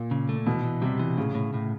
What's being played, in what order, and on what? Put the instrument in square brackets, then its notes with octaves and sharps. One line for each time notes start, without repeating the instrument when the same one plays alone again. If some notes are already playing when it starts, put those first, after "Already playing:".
Already playing: [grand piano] A#2
[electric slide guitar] C#3
A3
[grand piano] B2 [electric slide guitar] E3
[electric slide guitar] E3
[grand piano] C3 [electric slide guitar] G3
[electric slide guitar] E3
[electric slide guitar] A2 [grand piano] C#3
[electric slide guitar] A2
A2